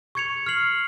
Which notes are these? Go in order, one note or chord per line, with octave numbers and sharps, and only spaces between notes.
C#6 G#6 C#7 F7
F6 C7 F#7